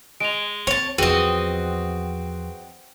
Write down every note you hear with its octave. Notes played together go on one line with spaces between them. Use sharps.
G#3 D7 F7
C4 C#5 A5
E2 F3 C4 F#4 G#4 B4 D#5 D#7